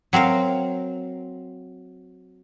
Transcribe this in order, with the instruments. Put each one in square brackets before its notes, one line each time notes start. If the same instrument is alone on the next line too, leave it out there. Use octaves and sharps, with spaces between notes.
[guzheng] F#3 C4 A#4 F5